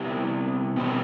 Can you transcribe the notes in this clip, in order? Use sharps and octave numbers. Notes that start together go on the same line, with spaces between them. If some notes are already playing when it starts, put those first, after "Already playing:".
Already playing: C3 G3 B3 E4 G4
B2 G3 C4